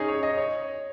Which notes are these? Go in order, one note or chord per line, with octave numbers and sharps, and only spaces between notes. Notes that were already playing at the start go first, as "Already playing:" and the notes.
Already playing: C#4 D#4 G#4
C#5
D#5
C#5